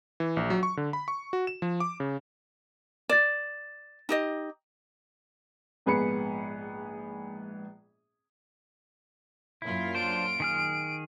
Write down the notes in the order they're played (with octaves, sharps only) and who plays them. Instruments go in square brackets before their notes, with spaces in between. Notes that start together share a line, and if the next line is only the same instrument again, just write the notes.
[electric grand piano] E3
A#1
F#3
C#6
D3
B5
C#6
F#4
E7
F3
D6
C#3
[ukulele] D5 [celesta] A6 E7
[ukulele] D#4 G4 D#5
[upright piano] A#1 G#2 B3 G#4 B5 C#7
[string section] F#2 A#2 F4 [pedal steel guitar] E4
[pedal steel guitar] D4 C5 [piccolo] D7
[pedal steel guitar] D#3 G#4 F6